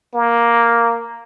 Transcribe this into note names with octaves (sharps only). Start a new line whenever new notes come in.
A#3